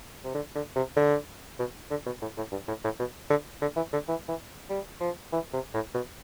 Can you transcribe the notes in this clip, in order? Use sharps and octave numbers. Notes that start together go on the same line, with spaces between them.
C3
D3
D3
C3
D3
B2
D3
B2
A2
A2
G2
A2
A2
B2
D3
D3
E3
D3
E3
E3
G3
F3
E3
C3
A2
B2